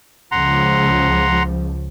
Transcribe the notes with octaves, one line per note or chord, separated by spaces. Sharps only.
C#2 F3 F#5 A#5 C6